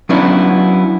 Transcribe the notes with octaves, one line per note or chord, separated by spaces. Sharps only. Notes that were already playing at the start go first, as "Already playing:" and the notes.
F#3 B3 C#4 D4 E4